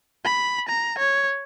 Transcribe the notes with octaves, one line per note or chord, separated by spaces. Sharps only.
B5
A#5
C#5